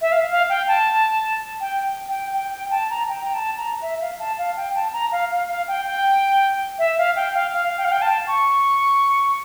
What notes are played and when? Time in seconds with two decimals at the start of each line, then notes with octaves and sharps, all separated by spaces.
0.02 E5
0.12 F5
0.30 F5
0.49 G5
0.68 A5
1.61 G5
2.09 G5
2.34 G5
2.53 G5
2.71 A5
2.90 A#5
3.09 G5
3.25 A#5
3.34 A5
3.58 A#5
3.82 E5
4.01 F5
4.20 A5
4.38 F5
4.57 G5
4.75 A5
4.93 A#5
5.12 F5
5.31 F5
5.49 F5
5.68 G5
5.86 G5
6.79 E5
6.98 F5
7.16 G5
7.34 F5
7.52 F5
7.78 G5
7.85 F5
7.92 G5
8.02 A5
8.27 C#6